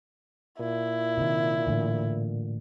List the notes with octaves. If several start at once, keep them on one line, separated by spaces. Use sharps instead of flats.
A#2 E4
C3 D#3
A2 D3 E3